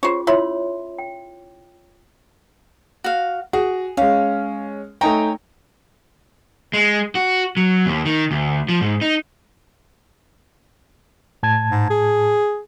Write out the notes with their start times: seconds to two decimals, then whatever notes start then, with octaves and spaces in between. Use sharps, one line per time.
0.03 C#4 F4 G#4 C5 C#5
0.27 E4 F4 C#5 C6
0.99 G5
3.04 F#4 F5
3.53 F#4 G#4
3.97 G#3 C#4 F5
5.01 A3 D#4 C#5 G5 G#5 A#5
6.73 G#3
7.15 F#4
7.57 F#3
7.86 D#2
8.06 D#3
8.31 D2
8.69 F3
8.81 G#2
9.01 D#4
11.43 A2 A5 G#6
11.71 G#2
11.90 G#4